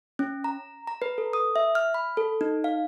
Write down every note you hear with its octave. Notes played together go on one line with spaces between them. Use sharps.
C#4
A#5
A#5
B4
A4
D#6
E5
F6
B5
A4
D#4
F5